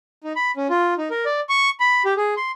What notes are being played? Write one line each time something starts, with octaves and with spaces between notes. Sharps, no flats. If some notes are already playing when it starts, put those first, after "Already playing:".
D#4
B5
C#4
F4
D#4
A#4
D5
C#6
B5
G4
G#4
C6